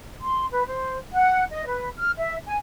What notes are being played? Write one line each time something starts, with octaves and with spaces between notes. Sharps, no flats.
C6
B4
C5
F#5
D#5
B4
F6
E5
G#5